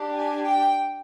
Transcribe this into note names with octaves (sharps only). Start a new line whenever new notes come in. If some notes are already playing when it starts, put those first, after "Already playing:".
Already playing: D4 G4
G#5
G5